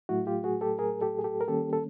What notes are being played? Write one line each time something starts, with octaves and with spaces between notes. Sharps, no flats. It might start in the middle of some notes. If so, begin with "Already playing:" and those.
A2 F#3 A3 E4 F#4
F4 G4
F#4 G#4
G4 A4
G#4 A#4
G4 A4
G#4
G4 A4
A#4
D#3 G3 A#3 C#4 G4 A4
A4